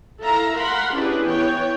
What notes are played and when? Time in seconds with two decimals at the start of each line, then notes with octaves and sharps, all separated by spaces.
0.21 E4 A4 E5 F5 A#5
0.56 A#4 F5 F#5 B5 C6
0.95 C#4 D4 E4 G4 G#4 B4
1.28 E3 B3 C#5 G5